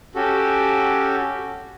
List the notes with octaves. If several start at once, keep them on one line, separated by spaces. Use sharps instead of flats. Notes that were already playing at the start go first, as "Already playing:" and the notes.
C#4 F#4 G4 A4